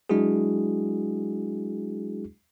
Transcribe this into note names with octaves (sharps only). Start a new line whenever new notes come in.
F#3 G#3 D4 E4 F#4 G#4